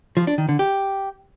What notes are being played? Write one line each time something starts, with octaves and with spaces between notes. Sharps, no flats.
F3
D4
D#3
D3
G4